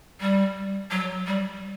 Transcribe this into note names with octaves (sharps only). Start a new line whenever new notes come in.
G3
F#3
G3